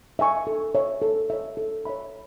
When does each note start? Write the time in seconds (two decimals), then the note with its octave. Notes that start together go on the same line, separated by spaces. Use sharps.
0.19 E5 G#5 C#6
0.47 A4
0.75 C#5 E5
1.02 A4
1.30 C#5 E5
1.57 A4
1.85 C#5 E5 B5